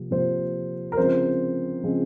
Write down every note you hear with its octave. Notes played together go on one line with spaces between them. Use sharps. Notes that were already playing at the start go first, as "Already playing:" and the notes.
Already playing: C3 F3 A#3
C3 F3 A#3 C5
A#4
C#3 F3 G#3 C4 C5
C#3 F3 G#3 C4